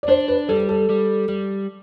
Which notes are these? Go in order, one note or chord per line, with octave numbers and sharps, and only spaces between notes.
D5
D4 C5
B4
G3 A4
A4
G3
G3